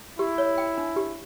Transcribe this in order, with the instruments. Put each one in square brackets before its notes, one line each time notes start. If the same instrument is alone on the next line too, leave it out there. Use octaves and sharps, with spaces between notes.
[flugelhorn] E4 [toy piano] G4
[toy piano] C#5
G5
D4
G4